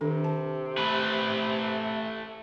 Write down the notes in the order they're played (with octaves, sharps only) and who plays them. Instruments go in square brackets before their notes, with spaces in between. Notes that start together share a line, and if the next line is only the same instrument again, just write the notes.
[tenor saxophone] C3 [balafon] D#3 D4 A4
[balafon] A5
[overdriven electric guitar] A3 B4